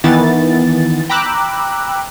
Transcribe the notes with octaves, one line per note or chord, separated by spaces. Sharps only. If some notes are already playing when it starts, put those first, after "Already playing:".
D#3 E3 B3 A6
G5 A#5 B5 D6 E6 F#6